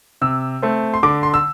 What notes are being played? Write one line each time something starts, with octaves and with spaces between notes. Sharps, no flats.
C3 E6
A3 C4
C6
D3 D6
C6
E6